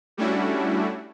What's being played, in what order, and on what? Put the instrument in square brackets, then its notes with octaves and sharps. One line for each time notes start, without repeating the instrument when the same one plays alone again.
[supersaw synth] G3 A3 C#4 D4 E4 F#4